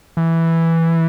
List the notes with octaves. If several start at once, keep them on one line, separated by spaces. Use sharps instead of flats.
E3